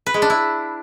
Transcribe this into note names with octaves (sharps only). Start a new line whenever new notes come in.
B4
G#3
D4
E4